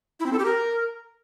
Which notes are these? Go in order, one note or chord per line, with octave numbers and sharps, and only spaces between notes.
E4
C4
A4
G4
A#4